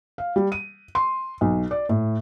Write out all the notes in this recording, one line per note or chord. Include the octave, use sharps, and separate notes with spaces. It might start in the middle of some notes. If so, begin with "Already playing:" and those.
F5
G3
D#7
C6
B1
D5
A2